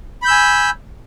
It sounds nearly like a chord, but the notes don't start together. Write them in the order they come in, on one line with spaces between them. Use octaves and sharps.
B5 G6 E6 G#5